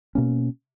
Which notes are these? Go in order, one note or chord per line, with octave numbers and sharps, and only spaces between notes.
B2 A#3 C#4